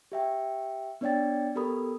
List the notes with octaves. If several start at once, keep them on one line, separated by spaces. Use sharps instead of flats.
G4 E5 G5
B3 D4 C#5 D5 G5 A6
B3 G4 A4 A#4 B5 D#6